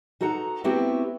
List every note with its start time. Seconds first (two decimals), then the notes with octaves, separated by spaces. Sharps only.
0.21 D#4 F#4 A4 F#5 A#5
0.64 A3 B3 C4 E4 F#4 G4